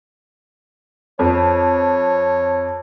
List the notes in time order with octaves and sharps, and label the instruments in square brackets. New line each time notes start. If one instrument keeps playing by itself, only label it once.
[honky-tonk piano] F2 [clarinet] C#5